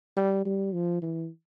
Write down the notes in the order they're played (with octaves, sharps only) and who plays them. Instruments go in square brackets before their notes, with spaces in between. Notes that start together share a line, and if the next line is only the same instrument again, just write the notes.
[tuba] G3
G3
F3
E3